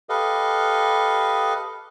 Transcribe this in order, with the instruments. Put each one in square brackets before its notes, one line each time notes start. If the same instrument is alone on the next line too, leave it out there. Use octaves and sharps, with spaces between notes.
[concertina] G4 A4 B4 D#5 F5